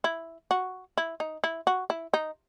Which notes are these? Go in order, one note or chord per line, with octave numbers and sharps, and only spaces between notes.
E4
F#4
E4
D#4
E4
F#4
E4
D#4